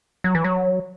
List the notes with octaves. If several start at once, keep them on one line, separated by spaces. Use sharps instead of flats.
F#3
E3
F#3